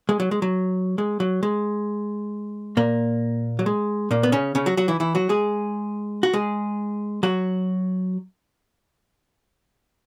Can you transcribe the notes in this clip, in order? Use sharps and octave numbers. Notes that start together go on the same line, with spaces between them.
G#3
F#3
G#3
F#3
G#3
F#3
G#3
A#2 A#3
F#3
G#3
A#2 A#3
B3
C#3 C#4
C#3 C#4
F#3 F#4
F#3 F#4
E3 E4
E3 E4
F#3 F#4
G#3 G#4
F#4
G#3 G#4
F#3 F#4